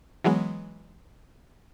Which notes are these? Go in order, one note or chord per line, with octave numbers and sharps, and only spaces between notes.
E3 F#3 G#3 B3